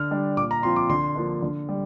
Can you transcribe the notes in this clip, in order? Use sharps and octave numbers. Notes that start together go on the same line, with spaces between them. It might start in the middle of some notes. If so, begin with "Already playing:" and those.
Already playing: D3 F6
G3 D4
A#2 D6
A#5
F3 C4 F4 C6
D6
D3 C6
F3 A#3 D4
D3
G3